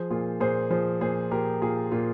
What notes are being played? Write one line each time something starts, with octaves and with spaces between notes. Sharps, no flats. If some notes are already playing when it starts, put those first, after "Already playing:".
Already playing: F3 G#4 C5
A#2 F4 G#4
A#2 G#4 C5
F3 G#4 C5
A#2 G#4 C5
A#2 G4 A#4
A#2 F4 G#4
A#2 F4